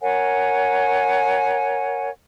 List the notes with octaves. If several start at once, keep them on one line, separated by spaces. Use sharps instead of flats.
A#4 C#5 F#5 G#5